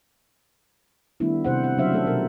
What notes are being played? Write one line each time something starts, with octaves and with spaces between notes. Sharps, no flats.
D#3 G3 A3 B3 D4 E4
C3 C5 F#5
F#5
C#3 F#3 D4 C5 E5 F5
A3 A4
B2 F#3 B3 A#4